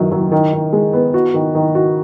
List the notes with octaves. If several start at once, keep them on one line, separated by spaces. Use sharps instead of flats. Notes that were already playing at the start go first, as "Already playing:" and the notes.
Already playing: F#2 D#3 F#3
F#3
D#3
D#3
G#3
B3
F#4
D#3
D#3
F#4